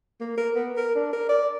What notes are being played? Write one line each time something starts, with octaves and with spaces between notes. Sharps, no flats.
A#3
A#4
B3
A#4
D4
A#4
D5